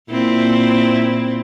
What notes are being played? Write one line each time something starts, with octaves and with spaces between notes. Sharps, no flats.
A#2 C4 E4